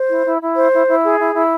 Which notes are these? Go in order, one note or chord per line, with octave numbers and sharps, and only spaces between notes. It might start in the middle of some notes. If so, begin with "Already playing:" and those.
Already playing: C5
E4
E4
E4
C5
E4
E4
G#4
E4
E4